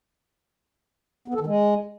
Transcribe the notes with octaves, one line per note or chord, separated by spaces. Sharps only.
B3
A4
D#3
G#3